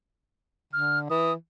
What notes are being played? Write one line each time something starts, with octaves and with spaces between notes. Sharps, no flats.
D3 F6
E3 D#6